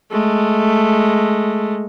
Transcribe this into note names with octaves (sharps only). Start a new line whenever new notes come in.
G#3 A3